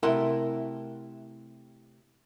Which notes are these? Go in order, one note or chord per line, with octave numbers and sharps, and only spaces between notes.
C3 A3 E4 A#4 F#5 C6